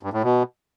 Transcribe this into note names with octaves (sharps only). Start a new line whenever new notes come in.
G2
A2
B2